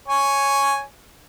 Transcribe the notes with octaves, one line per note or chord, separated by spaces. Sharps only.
C#5 G#5